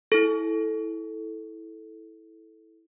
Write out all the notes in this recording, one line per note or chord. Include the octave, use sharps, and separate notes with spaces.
E4 A4